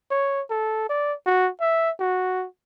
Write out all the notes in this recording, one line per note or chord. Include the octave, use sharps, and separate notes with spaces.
C#5
A4
D5
F#4
E5
F#4